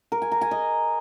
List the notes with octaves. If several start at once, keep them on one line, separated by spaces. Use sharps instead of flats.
A#4
G#5
A#5
G#5
D#5